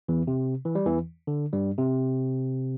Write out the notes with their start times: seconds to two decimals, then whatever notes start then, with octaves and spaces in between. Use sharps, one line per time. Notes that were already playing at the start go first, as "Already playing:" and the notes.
0.08 E2 E3
0.27 C3
0.65 E3
0.75 G3
0.86 E2 E3
1.27 D3
1.53 G2 G3
1.78 C3